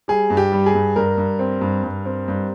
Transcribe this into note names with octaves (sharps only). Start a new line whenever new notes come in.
G3 G#4
G2
G4
G3
G#4
G2
G2 A#4
G2
C4
G2
G2
C4
G2